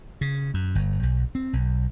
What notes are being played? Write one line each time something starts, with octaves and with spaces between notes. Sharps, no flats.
C#3
F#2
G1
B1
C4
B1